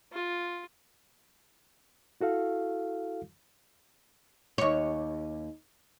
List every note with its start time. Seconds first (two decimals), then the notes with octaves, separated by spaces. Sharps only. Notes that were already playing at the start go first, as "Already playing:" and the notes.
0.12 F4
2.21 E4 F#4 A4 F5
4.58 D#2 C#5